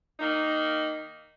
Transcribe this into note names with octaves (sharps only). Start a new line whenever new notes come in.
D#3 A#3 D#4